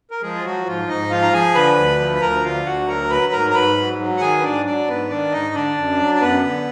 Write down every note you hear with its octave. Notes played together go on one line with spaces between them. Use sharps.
A#4
F3 G#3 G#4
F4
F3 F#3 F#4
G#2 F3 F4
G#2 D#4 D#5
F3 F4 F5
A#5
F3 G#4 G#5
D3 B4 B5
D2
F3
B5
D2 A#4 A#5
D3 F4 F5
D2 F#4 F#5
F#3 A#4 A#5
F#3 B4 B5
G#2 A#4 A#5
A#5
G#2 B4 B5
F#3
F#3
F#5
D#3 G#4 G#5
B4
G#2 D4 D5
F#3 D4 D5
G#2 B3 B4
D#3 D4 D5
G#2 D#4 D#5
D3 D4 D5
F#2
F#3
D5
F#2 B3 B4
D3